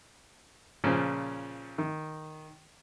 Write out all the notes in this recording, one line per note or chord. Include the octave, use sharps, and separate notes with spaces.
A#2 C#3 F3 C#4
D#3